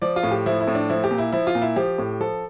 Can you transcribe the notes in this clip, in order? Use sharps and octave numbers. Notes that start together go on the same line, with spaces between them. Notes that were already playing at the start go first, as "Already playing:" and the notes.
F3 D5
F4
A2
G4
F3 E4
E4
A2
D4
F3 E4
G4
A#2
E4
F3 E4
F4
A#2
E4
F3 G4
A2
F3 A4